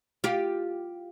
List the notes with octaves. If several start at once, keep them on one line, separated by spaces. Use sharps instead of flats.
F4 G4